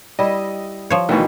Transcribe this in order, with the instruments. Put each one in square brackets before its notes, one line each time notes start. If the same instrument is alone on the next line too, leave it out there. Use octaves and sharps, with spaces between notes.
[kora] G3 E4 [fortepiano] D#5
[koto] F3 C#5
[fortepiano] D2 B2 [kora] D#3 E3